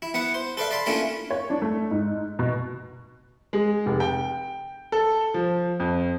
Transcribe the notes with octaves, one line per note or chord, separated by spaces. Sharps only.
E4
B3 E4 F#5
C5
A4 B4 D5 E5 F5
D5 A5 B5 C6
A3 A#3 C#4 D4 E4 F4
C#5
D4
A3
G#2
B2
G#3
F1
G5
A4
F3
F2